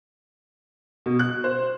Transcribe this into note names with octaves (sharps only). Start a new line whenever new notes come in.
B2
F#6
C5